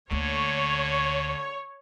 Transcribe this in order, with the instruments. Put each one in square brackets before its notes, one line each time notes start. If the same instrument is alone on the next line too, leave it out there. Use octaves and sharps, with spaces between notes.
[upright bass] D2 A#3 [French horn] D3 [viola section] C#5